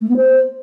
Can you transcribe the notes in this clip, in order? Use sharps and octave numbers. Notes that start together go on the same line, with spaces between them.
A3
B3
C5